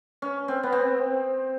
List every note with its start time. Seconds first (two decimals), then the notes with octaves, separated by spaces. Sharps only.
0.22 C#4
0.48 C4
0.63 B3
0.72 C4